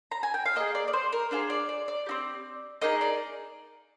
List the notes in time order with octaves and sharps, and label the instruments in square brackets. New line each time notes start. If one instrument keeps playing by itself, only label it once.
[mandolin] A#5
G#5
G5
F5
A#3 F4 G#4 D#5
D5
D5
C5
A#4
D4 F4 G#4 C5
D5
D5
D5
C4 D#4 G4
A#3 D#4 G#4 D#5
D5